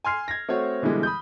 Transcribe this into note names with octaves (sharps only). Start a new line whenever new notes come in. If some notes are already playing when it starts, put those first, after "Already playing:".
G#5 C6 F6 C7
G#6 A#6
A3 C4 F#4 C#5
B2 D3 E3 G3 G#3
B5 D#6 G6